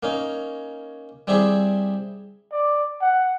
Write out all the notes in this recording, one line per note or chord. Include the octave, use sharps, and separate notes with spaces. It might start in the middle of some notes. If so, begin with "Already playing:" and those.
A#3 C#4 D#4
G3 C4 E4 G4 G#4
D5
F#5